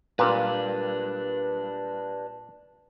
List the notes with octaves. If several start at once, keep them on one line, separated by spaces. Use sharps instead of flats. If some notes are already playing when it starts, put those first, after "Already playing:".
A#2 D4 G4 B4